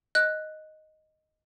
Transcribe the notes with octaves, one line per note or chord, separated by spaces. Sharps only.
D#5 F#6